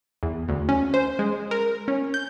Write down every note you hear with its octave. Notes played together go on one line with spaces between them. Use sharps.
E2
D2
C#4
C5
G#3
A#4
C#4
G6